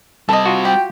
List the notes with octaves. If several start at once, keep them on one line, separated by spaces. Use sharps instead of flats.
G3 C4 A4 D#5
F4 F#4
G4 G5